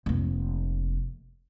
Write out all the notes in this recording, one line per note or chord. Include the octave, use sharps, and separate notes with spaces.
F1 A#3